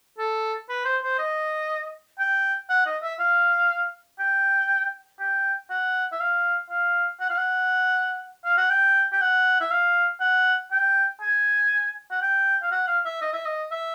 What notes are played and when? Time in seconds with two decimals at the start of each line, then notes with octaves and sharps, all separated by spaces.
0.18 A4
0.69 B4
0.85 C5
1.03 C5
1.19 D#5
2.19 G5
2.69 F#5
2.86 D#5
3.03 E5
3.19 F5
4.19 G5
5.20 G5
5.70 F#5
6.12 E5
6.20 F5
6.70 F5
7.20 F#5
7.29 F5
7.38 F#5
8.45 F5
8.57 F#5
8.70 G5
9.12 G5
9.21 F#5
9.61 E5
9.71 F5
10.20 F#5
10.71 G5
11.21 G#5
12.11 F#5
12.21 G5
12.63 F5
12.71 F#5
12.87 F5
13.05 E5
13.21 D#5
13.33 E5
13.46 D#5
13.71 E5